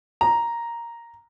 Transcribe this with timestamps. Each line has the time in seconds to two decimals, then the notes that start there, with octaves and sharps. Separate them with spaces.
0.21 A#5